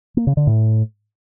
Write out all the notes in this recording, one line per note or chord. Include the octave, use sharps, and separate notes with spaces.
A#3
C#3
D3
A2